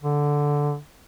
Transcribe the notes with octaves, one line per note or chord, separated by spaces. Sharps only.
D3